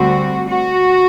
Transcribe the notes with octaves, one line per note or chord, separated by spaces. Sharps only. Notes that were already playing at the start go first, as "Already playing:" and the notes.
Already playing: D2 D3 G3 C4 F#4
F#4